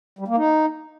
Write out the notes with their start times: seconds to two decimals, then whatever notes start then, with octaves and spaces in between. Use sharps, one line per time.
0.19 G3
0.28 A#3
0.37 D#4